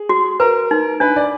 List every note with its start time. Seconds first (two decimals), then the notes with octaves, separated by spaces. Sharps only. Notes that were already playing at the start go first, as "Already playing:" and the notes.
Already playing: G#4
0.09 F#4
0.40 A#4 B4
0.71 D#4
1.00 D4 B4
1.16 D5